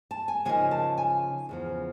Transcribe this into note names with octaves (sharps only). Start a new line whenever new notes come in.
A5
G#5
C#3 F3 A#3 D#4 G#5
A5
G#5
E2 C#3 F3